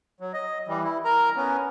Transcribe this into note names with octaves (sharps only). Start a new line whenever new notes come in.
F#3
D#5
E3 G3
E4
A#4 A#5
B3 C#4